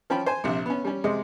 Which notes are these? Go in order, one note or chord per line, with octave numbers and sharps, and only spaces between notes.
F3 C#4 G5 B5
C5 G#5
A#1 C3
B3 C#4
G3 C#4
C3 G#3 D#5